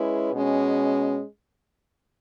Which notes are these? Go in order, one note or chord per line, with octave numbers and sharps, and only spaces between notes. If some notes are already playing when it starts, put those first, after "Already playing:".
Already playing: G#3 C#4 E4 G#4 B4
B2 G#3 C#4